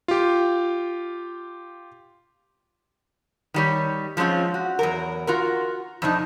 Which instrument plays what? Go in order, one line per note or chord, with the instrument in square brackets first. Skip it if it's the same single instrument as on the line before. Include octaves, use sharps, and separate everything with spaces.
[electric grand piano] F4 G4
[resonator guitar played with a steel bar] D#3 G3 C#5
F3 G#3 C4 C#4 F4
F#4
E2 F#3 A#4
F4 F#4 A#4
F2 C3 D4 D#4